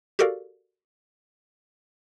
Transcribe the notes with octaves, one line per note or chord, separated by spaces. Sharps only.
F#4 G4 A4 A#4 D5 F5